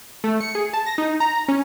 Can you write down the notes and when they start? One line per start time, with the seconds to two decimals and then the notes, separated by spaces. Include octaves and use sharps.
0.24 A3
0.41 C#7
0.55 G#4
0.73 A5
0.86 A#6
0.98 D#4
1.20 A#5
1.48 C#4